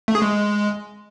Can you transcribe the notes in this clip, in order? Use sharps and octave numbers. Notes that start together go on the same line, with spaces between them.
A3
G#4
G#3